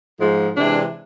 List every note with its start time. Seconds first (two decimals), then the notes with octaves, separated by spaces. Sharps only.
0.20 G#2 F3 G#3
0.56 C3 E3 G#3 D4